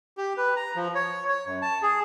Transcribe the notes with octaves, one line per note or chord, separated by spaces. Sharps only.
G4
B4
A#5
F3
C#5
C#5
F#2
A5
G#4